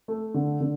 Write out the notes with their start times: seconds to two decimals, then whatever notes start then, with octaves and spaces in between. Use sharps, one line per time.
0.08 A3
0.34 D3
0.60 D3